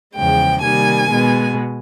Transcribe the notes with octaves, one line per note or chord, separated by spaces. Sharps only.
E2 C#3 F3 G#3 G5
C3 D#3 G3 A#3 G#5
B2 G#3 B3